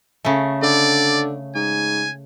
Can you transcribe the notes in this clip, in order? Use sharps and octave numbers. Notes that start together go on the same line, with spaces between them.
C#3 A3
D3 D5
G#2 G#5